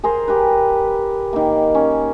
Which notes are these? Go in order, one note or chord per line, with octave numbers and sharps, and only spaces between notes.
G#4 A#4 C5
G4 A#4 B4
D#3 A#3
C#4